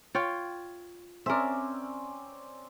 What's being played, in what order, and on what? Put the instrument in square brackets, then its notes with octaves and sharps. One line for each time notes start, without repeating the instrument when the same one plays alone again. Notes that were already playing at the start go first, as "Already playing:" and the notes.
[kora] F4 C#5 G5
[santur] C4 C#4 D5 [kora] A#4 E5